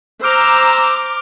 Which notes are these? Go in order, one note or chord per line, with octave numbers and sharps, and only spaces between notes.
C5 A#5 D6 E6 F6 D7 F7